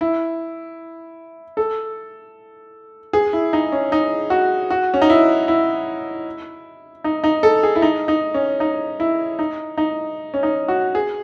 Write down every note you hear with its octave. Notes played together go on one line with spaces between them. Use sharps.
E4
A4
G#4
E4
D#4
C#4
D#4
F#4
F#4
C#4
D#4
E4
E4
D#4
D#4
A4
G#4
E4
D#4
D#4
C#4
D#4
E4
D#4
D#4
C#4
D#4
F#4
G#4